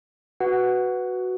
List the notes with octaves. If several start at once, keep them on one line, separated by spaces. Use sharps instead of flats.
F#4 B4 F#5